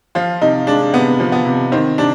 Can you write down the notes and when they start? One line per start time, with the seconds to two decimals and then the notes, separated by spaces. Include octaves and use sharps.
0.15 F3 F4
0.41 C3 D#4
0.67 G#3 D4
0.94 C3 B3
1.20 F3
1.32 B3
1.45 C3
1.72 D#3 C4
1.98 C3 D4